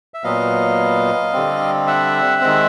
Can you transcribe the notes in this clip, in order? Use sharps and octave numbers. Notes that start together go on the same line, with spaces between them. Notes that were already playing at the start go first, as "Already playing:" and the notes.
E5
A#2 F#3 B3 D#5 F5
D3 G3 C4
E5 F#5
D#3 G#3 C4